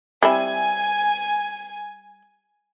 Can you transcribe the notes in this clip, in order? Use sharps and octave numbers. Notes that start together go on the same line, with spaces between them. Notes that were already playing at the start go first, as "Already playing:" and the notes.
G3 C4 E4 G#5